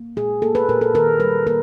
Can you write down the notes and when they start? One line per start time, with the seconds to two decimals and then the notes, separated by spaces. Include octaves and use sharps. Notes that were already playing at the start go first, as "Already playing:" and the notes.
Already playing: A#3
0.16 A#2 G#4
0.42 A#3 A4
0.55 B4
0.69 A#2 A#4
0.81 A4
0.94 D#3 A#4
1.20 G3 B4
1.46 A#3 A#4